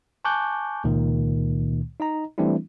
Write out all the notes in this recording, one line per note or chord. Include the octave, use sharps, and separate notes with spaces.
G#5 A5 C#6 D6 F#6 G6
C#2 A#2 D#3 A#3
D#4 D#5 A#5
E3 G3 A3 C4 D4 E4